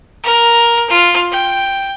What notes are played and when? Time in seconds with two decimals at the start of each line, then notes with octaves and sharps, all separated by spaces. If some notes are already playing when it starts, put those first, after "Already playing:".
0.24 A#4
0.90 F4
1.32 G5